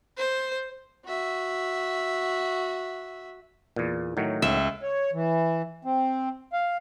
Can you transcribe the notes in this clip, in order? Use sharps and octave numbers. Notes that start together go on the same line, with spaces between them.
C5
F#4 E5
E2 A#2
A2 D#3 F#3
C#2 E5
C#5
E3
C4
F5